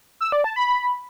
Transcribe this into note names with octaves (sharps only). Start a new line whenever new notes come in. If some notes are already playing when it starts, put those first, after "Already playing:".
E6
D5
A5
B5